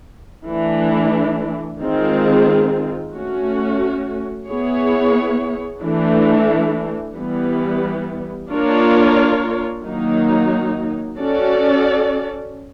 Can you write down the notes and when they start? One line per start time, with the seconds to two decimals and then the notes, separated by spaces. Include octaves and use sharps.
0.47 E3 A3 D4
1.81 D#3 G#3 C4 F4 G#4
3.14 A3 C#4 F#4
4.48 B3 E4 G#4 C#5
5.82 E3 A3 D4
7.17 E3 G3 B3
8.51 A#3 D4 F4 A#4 C#5
9.84 D#3 F#3 A#3 D#4
11.18 C#4 F#4 A4 D5